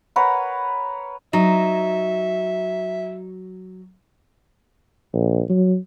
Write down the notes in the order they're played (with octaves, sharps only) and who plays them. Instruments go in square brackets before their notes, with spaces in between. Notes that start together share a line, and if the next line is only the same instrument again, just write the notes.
[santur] A#4 B4 C#5 F#5
[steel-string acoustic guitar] F#3 [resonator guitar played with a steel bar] D#4 [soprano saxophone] E5
[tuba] A#1
F#3